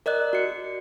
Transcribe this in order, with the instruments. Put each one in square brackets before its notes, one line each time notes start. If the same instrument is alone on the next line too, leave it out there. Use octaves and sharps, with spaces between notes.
[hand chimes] A#4 D5 D#5 F#6
F#4 C#7